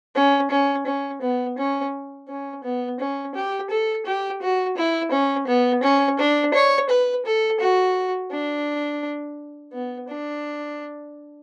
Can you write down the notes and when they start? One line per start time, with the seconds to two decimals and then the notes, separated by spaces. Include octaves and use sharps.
0.15 C#4
0.51 C#4
0.86 C#4
1.22 B3
1.58 C#4
2.28 C#4
2.64 B3
3.00 C#4
3.35 G4
3.70 A4
4.06 G4
4.42 F#4
4.77 E4
5.12 C#4
5.47 B3
5.83 C#4
6.19 D4
6.54 C#5
6.89 B4
7.26 A4
7.60 F#4
8.32 D4
9.73 B3
10.08 D4